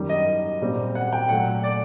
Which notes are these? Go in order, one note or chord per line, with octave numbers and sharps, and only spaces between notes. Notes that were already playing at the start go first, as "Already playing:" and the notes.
Already playing: F#2 D#3 G3
D#5
A#2 G3 C4
F#5
G5
A#2 F#3 A3 F#5
D5